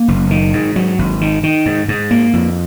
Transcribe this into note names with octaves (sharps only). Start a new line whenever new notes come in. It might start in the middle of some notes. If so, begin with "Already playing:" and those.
Already playing: A#3
F#1
D#3
G#2
F#3
G#1
D#3
D#3
G#2
G#2
A#3
F2